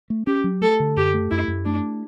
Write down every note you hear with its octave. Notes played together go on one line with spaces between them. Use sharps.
A3
C#4 G4
F#3
A3 A4
D3
F#2 G4
A3
F#2 E4
F#2
A3 D4